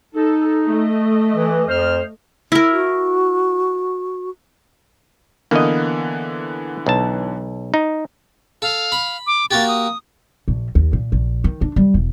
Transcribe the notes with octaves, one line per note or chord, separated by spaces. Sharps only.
D#4 A4
A3 D#5
E3
F2 C5 F6
E4 A#4
F#4
D3 E3 A#3 B3 D#5
B1 A5
D#4
A4 F5
B5
D6
A#3 F#4 G4 A6
D#6
A#1
D#2
A#2
A#1
D#3
D4
G3
E1